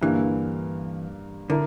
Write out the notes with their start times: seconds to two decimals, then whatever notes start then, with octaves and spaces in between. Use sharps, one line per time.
0.02 G2 D3 E3 A#3
1.50 D3 E4 A#4